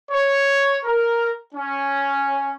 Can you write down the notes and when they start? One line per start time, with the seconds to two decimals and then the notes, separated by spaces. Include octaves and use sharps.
0.11 C#5
0.85 A#4
1.55 C#4